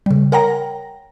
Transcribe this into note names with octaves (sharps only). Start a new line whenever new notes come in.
C#3 G3
A#4 C#5 F#5 G5 A#5 A#6